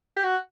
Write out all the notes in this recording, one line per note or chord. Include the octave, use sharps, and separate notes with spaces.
G4
F#4